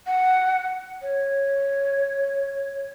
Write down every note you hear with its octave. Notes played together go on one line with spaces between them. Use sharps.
F#5
C#5